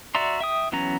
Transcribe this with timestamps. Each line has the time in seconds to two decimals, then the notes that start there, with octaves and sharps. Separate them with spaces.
0.15 F#4 D5 E5 A#5 C6
0.40 E5 G5 D#6
0.72 E3 F#3 B3 C#4 A#5